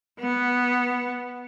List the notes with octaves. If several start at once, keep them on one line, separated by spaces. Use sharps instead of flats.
B3